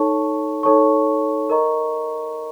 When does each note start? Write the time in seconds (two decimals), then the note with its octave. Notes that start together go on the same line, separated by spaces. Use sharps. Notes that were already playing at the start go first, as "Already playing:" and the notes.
Already playing: D#4 A4 C#5 A5 C#6
0.63 D#4 A4 C#5 A5 C#6
1.50 A#4 D#5 A#5 C#6